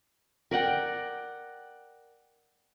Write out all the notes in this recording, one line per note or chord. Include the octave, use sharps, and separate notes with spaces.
A#4 D5 F#5 G5